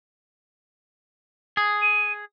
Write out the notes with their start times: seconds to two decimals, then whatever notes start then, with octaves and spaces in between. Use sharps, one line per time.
1.57 G#4
1.81 D#7